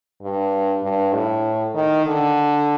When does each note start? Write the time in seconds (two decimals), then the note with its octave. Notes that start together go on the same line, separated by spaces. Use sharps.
0.22 G2
0.83 G2
1.13 A2
1.75 D#3
2.06 D3